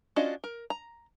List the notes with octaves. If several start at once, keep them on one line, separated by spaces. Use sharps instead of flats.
C#4 D4 F4 F#4 D#5
A#4
A#5